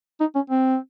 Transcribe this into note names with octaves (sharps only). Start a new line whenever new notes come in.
D#4
C#4
C4